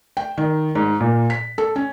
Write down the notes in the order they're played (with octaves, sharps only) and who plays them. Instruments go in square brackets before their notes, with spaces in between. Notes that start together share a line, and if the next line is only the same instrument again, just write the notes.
[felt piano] G5
D#3
G#2
A#2
B6
A4
C#4